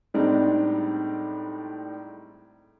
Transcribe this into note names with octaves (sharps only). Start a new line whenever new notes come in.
A2 G3 G#3 C4 D4 D#4